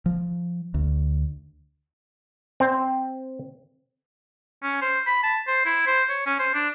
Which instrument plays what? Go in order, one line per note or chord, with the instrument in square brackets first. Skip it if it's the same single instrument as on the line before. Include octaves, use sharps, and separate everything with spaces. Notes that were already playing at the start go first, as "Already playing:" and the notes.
[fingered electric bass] F3
D2
[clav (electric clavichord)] C4 C5
[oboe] C#4
C5
B5
A5
C5
E4
C5
C#5
C#4
C5
D4